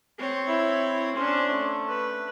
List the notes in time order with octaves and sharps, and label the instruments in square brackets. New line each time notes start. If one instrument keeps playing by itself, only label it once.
[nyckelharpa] C4 C#5
[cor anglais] E4
[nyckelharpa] C#4 D4 [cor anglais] C5
[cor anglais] A3
[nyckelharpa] B4